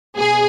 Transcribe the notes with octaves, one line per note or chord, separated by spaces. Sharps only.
B2 G#4